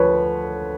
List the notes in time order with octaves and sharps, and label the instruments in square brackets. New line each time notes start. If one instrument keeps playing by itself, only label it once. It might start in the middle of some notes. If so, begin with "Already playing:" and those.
Already playing: [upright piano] D2 F3 B4 C#5